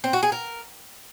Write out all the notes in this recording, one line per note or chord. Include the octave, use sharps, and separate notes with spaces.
C4
F#4
G#4
A#4